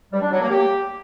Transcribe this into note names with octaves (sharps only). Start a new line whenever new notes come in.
G3
D4
F#3
A#3
G4